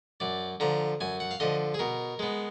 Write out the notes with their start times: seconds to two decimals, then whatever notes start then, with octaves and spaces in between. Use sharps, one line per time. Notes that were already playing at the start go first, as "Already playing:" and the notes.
0.20 F#2 D5
0.60 D3 F3 A#5
1.01 F#2 G#5
1.20 F#5
1.31 F5
1.40 D3 F3 D#5
1.74 G#4
1.79 B2 A#4
2.19 G#3 B3